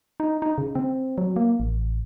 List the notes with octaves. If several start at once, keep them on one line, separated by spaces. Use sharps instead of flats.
D#4
D#4
C#3
C4
F#3
A#3
A1